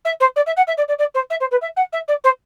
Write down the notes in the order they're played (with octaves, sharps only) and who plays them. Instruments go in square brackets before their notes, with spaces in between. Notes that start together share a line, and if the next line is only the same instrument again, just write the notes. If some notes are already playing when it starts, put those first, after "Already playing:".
[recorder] E5
C5
D5
E5
F#5
E5
D5
D5
D5
C5
E5
C5
B4
E5
F#5
E5
D5
C5